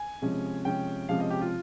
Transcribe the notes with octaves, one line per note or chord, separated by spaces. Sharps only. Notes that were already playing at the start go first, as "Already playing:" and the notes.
Already playing: G#5
C3 F3 G#3 C#4
C3 F3 G#3 C#4 G5
C3 F3 G#3 C#4 F5
D#5
G4
F4